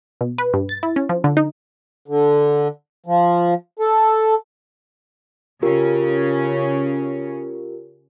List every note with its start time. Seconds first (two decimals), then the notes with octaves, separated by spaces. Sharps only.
0.21 B2
0.38 B4
0.54 G2
0.69 A6
0.83 E4
0.96 C#4
1.09 F3
1.24 D3
1.37 D#4
2.08 D3
3.06 F3
3.79 A4
5.63 C#3 C#4 F4 G4 A#4